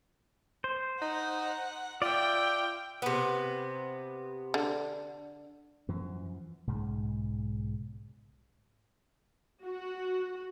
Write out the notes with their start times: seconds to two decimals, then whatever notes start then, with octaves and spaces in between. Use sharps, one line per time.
0.64 C5
1.02 D#4 F#5
2.02 F4 D5 E5 G5
3.02 C3 B3
4.54 D3
5.88 F#2 E3 F3
6.67 B1 G#2 C#3
9.64 F#4